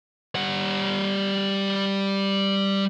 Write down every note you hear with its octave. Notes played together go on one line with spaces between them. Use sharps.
G3 F#5